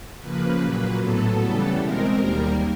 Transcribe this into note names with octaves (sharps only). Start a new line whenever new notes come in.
C#3 F3 A#3 B4
A#2 F#3 A#3
A2 F#3 B3 A4
C#3 E3 G3 B3
B2 G#3 C4 A#4
D#2 D#3 G3 A#3